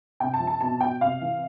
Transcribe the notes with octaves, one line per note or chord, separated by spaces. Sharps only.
C3 G5
A5
F3
A5
B2 A5
B2 G5
C3 F5
E3